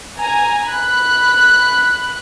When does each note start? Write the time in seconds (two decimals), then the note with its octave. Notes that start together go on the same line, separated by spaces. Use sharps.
0.19 G#5 A#5
0.68 B5 F#6